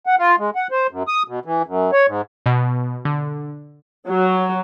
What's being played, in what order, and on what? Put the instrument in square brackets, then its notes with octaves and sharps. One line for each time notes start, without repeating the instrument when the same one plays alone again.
[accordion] F#5
F4
G#3
F#5
C5
F#2
D#6
B2
E3
F#2
C#5
G#2
[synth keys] B2
D3
[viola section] F#3